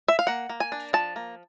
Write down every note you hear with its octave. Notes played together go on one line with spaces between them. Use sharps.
E5
F5
A#3 F#5
A#3
G#5
D4
F3 A5
A#3